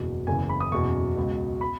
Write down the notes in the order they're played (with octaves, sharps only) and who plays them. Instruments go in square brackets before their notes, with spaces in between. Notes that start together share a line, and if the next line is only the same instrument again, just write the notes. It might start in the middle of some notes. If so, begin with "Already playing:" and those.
Already playing: [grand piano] F#1 E2 B2
F#1 E2 C#3 E3 G#5
B5
D#6
F#1 E2 B2 C#6
C#2 B2
B5